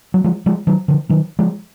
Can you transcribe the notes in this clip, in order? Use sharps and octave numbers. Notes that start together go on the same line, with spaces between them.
F#3
F3 G#3
F3 G#3
D#3 F#3
D3 F3
D#3 F#3
F3 G#3